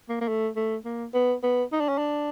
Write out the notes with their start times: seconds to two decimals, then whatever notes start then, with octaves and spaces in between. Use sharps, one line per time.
0.09 A#3
0.21 A#3
0.28 A3
0.56 A3
0.85 A#3
1.14 B3
1.43 B3
1.72 D#4
1.80 D4
1.89 C#4
1.98 D4